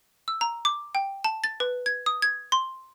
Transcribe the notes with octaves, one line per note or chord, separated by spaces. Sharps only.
E6
A#5
D6
G5
A5
A6
B4
G#6
D#6
G#6
C6